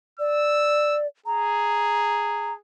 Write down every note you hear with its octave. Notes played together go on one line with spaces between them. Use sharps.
D5 E6
G#4 A#5